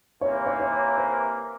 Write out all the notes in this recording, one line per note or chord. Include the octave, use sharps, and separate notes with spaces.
C3 E3 A#3 C#5
C#5
C#5
C5